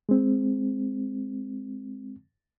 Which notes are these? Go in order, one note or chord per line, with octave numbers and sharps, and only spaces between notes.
G#3 C4